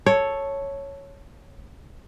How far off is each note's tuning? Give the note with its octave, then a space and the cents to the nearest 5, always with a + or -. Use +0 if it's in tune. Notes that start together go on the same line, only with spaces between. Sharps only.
A4 +0 C#5 +0